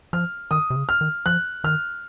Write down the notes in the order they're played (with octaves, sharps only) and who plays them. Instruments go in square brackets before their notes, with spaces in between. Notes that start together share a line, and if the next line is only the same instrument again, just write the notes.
[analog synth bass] F3 [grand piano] F6
[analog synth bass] D#3 [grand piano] D#6
[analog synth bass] C3
C#3
[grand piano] F6
[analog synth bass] D#3
[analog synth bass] F3 [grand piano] F#6
[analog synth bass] D#3 [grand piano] F6